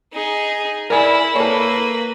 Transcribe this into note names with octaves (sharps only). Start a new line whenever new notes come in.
D#4 G#4
E4 A#4 D5 G#5
A#3 A4 B4 C#5